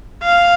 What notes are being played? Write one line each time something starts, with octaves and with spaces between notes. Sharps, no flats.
F5